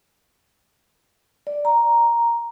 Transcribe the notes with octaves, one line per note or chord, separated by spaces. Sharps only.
D5
A#5